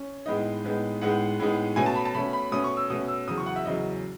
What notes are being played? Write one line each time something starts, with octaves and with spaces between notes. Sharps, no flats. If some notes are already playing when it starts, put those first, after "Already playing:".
Already playing: C#4
A2 G#3 B3 D#4 D#5
A2 G#3 B3 D#4
A2 G#3 B3 D#4 F#5
A2 G#3 B3 D#4
B2 A3 C#4 G#5
A5
B5
A5
B2 A3 C#4 B5
B5
B2 A3 C#4 D#6
C#6
E6
B2 A3 C#4 D#6
E6
E2 C#3 F#3 D#6
C#6
F#5
E5
E2 C#3 F#3 D#5